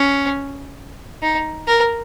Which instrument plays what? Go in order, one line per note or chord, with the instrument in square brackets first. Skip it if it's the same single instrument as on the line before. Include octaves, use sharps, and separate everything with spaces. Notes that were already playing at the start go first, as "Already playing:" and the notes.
Already playing: [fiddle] C#4
D#4
A#4